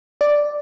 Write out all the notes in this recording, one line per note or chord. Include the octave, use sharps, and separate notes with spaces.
D5